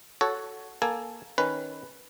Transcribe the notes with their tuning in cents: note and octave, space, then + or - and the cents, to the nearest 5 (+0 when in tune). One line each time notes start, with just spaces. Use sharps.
F#4 +0 A4 -5 C#5 +5
A#3 +10 A4 +0 G#5 +0
D#3 +0 C#4 +0 B4 +5